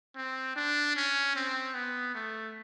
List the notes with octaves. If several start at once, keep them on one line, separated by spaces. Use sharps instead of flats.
C4
D4
C#4
C4
B3
A3